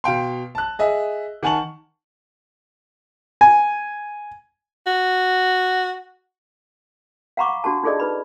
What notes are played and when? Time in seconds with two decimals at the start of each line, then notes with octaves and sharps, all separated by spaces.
0.04 B2 F5 G5 C6
0.55 A5 F#6
0.79 G#4 D#5 E5
1.43 D#3 F#5 G#5 A5 C#6 F#7
3.41 G#5
4.87 F#4
7.37 F5 F#5 A#5 B5 C#6 D6
7.64 D4 F#4 G4 A5
7.84 D#4 F4 G#4 A4 D5 D#5
8.00 D#4 B4 B5